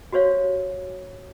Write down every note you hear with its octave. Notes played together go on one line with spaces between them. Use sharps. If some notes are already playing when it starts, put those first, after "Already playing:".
F#4 G4 C5 C#5 F5